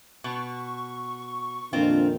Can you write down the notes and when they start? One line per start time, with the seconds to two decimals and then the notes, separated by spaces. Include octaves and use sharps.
0.24 B2 C#6
1.73 F2 A#2 D#3 C4 D4 F4